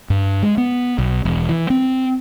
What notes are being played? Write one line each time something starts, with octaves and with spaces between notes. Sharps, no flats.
G2
G#3
B3
B1
E1
E3
C4